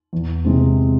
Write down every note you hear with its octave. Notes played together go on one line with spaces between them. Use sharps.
E2
C3 E3 G#3 C4